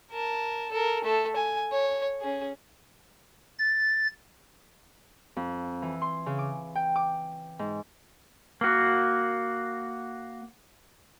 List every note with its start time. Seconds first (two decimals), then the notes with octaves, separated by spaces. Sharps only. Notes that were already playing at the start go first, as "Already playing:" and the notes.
0.12 A#4 A5
0.71 A4 A#4
1.04 A3 A4
1.36 G#5
1.72 C#5
2.22 C#4 G#4
3.58 A6
5.36 F2
5.82 E3
6.02 C6
6.26 C#3
6.38 D6
6.75 G5
6.96 D6
7.59 G#2
8.61 A#3 F#4